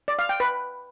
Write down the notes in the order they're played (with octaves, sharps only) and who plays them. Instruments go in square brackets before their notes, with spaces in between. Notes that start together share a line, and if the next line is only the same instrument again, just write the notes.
[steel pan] D5
F5
G5
B4